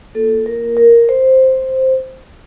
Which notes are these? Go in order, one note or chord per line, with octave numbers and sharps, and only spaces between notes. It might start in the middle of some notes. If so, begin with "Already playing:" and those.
A#3 F4 A4
A#4
A#4
C5